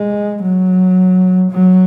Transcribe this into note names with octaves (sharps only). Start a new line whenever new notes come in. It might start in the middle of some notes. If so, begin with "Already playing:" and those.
Already playing: G#3
F#3
F#3